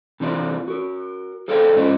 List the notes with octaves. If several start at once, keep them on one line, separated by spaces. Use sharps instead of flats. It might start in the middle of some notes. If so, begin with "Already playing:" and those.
C3 E3 C4 D4 F4
F#4 A#4
G#4 A4 C5 D5 F5 G5
G#2 C#4 F4 C5 D#5